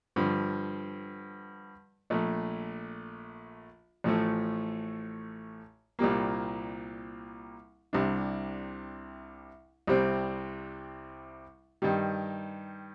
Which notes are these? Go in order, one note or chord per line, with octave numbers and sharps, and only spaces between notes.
G2 D3 F3
A#1 A#2 A3
A1 A2 F3 A3
C2 A#2 G3 A#3
C2 C3 G3 D4
C2 C3 G3 C4
G2 D#3 G3